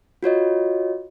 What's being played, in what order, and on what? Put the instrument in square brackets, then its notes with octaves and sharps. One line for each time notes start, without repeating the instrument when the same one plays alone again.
[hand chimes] F4 F#4 C#5 D#5